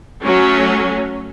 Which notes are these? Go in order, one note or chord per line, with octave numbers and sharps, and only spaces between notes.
F#3 A3 C#4